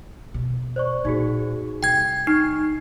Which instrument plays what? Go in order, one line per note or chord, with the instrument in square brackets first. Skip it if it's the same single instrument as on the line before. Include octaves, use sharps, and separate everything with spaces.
[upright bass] B2
[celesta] C5 D5 C#6
[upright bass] A#2 [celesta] D#4 F#4 G#4
[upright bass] C3 G3 [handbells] G5 G#6
[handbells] D#4 [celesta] C#6